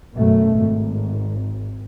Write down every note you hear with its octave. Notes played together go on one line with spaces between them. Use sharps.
F#2 B2 A3
G#1